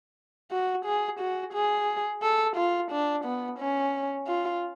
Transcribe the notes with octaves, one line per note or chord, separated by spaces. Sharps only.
F#4
G#4
F#4
G#4
A4
F4
D4
B3
C#4
F4